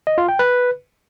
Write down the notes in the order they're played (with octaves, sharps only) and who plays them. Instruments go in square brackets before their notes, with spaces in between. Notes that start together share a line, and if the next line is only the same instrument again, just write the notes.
[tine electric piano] D#5
F4
G5
B4